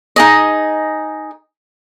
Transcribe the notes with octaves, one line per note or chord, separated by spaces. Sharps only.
D#4 G#4 D#5